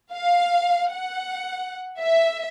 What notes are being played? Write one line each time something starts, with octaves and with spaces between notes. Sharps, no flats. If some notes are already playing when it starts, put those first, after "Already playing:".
F5
F#5
E5